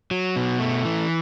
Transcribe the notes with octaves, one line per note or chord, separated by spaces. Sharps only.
F#3
B2
A3
E3